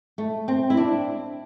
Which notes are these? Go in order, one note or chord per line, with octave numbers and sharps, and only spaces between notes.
A3
C4
E4
D4